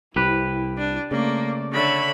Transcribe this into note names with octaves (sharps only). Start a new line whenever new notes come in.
C2 C3 E4 G4 B4
D4
C#3 A3 A#3 D5
D3 C#5 E5 B5